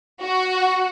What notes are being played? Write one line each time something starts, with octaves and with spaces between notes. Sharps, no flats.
F#4